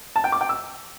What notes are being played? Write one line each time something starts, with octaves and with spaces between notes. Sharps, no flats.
A5
G5
D6
G5
E6